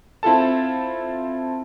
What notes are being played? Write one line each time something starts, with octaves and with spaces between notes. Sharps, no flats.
C4 E4 F4 A4 A5